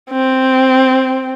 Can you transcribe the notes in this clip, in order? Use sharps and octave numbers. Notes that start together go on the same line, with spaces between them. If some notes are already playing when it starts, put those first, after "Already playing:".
C4